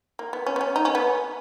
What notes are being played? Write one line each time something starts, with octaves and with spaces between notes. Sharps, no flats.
A#3
B3
C#4
B3
C#4
D#4
C#4
B3